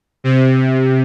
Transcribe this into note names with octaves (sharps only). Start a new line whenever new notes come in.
C3